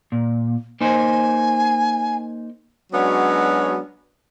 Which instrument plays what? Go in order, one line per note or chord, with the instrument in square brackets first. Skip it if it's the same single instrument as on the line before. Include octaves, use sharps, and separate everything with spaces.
[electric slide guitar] A#2
[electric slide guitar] A#3 D#4 C5 [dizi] G#5
[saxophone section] F#3 G#3 B3 C#4 D4 F#4